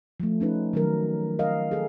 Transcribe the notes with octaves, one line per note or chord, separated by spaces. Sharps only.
F3 A3
C#4 D#4 B4
D#3 F#3 A#4
A#4 D#5 F5
G#4 A4